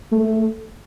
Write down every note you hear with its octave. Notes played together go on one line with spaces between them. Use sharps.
A3